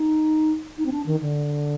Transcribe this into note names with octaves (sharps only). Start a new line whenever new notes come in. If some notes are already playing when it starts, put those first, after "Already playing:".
Already playing: D#4
D#4
C4
D4
D#3
D3